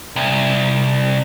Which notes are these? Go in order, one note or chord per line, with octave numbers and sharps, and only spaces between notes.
C2